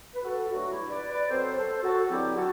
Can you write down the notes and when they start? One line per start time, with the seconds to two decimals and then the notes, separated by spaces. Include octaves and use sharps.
0.15 B4
0.23 F#4 A4
0.50 G2 F#3 A3 D4 F#4
0.70 E4 G4
0.90 B4 D5
1.09 B4 D5
1.29 C3 F#3 C4 A4 C5
1.56 A4 C5
1.83 F#4 A4
2.00 A4
2.09 E2 D3 F#3 C4 E4 G4
2.35 F#4 A4